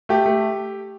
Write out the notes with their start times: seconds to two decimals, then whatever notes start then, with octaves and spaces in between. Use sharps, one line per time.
0.09 A3 G4
0.26 A3